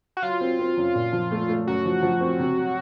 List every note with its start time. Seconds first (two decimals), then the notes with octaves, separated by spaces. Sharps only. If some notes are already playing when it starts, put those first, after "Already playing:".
0.17 F#4
0.22 F#3 F4
0.41 C4
0.59 C4
0.77 F#2
0.95 A#2
1.12 F3
1.31 A3
1.49 A3
1.67 F#2 F#4
1.85 F3
2.02 F3
2.21 C4
2.39 C3
2.57 F#3